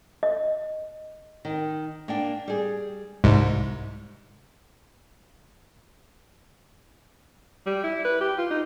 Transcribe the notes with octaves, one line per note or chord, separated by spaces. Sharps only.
D#5
D#3
A#3 D4 G5
G3 G#4
C2 G#2
G3
E4
B4
G4
F4
D#4